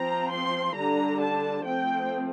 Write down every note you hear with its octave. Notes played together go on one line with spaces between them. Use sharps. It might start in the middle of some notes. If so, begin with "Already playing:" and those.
Already playing: F3 C4 A#5
C6
D3 G3 D4 A#5
A5
F3 A3 C4 G5